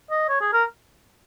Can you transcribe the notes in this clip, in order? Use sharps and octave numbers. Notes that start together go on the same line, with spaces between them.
D#5
C#5
G#4
A#4